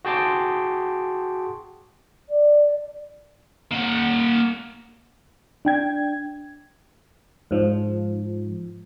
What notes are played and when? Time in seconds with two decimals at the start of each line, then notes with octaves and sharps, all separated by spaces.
0.05 F#4 G#4 G5 A5 C6 D6
2.28 D5
3.72 A#3 F#5
5.65 D4 G5 G#6
7.51 G#2 F3